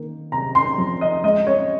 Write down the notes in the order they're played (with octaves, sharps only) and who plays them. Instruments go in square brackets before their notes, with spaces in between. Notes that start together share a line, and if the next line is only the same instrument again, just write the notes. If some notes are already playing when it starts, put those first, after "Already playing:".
Already playing: [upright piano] D#3 A#3
C3 A#5
C6
F2
D#5
G#3 D#5
C#5